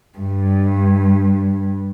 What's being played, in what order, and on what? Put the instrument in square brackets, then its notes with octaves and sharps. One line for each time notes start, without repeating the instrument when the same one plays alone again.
[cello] G2